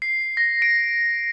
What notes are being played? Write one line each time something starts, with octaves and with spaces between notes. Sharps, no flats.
C7
A#6
D7